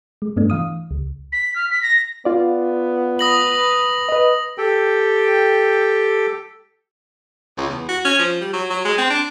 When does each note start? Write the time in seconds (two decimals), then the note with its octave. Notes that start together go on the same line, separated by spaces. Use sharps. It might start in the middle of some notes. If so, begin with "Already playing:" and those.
0.22 G#3
0.36 G2 A3 B3 D4
0.50 E3 F5 D#6
0.91 C#2
1.32 B6
1.56 F6
1.71 B6
1.82 A#6
2.25 B3 F4 D5
3.19 B4 D#6 A#6 F#7
4.09 B4 D#5
4.58 G4 A4 G5
7.57 C#2
7.69 E2
7.89 F#4
8.05 C#4
8.19 F3
8.41 G3
8.53 F#3
8.70 F#3
8.85 G#3
8.98 C4
9.10 D4